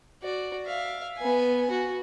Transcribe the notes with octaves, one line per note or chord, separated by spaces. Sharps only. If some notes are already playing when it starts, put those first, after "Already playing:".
F#4 D5
E5 F5
B3 G#5
F#4